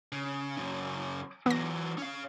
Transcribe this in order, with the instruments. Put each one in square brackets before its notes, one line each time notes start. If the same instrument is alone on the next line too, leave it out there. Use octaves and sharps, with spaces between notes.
[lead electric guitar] C#3
F#2 C#3
[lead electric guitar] E3 F#3 [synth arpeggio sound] B3 A#6
[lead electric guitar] C#4 F5